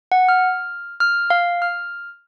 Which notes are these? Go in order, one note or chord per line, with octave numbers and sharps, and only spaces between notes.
F#5
F6
F6
F5
F6